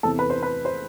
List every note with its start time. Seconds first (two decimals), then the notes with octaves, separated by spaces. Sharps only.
0.03 E2 C3 E3 A4
0.19 B4
0.30 C5
0.43 B4
0.65 C5